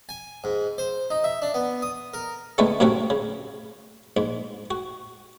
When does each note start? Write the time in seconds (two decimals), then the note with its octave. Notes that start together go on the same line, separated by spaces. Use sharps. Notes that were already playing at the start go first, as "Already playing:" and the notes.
0.09 G#5
0.44 G#2
0.78 C5
1.11 D#4
1.24 E5
1.42 D4
1.54 B3
1.82 D#6
2.13 A#4
2.58 D3 E3 G#3 A3 B3 C#4
2.80 F#2 A2 C3 A3 C#4 F#4
3.10 C#3
4.17 A#1 G#2
4.71 F#4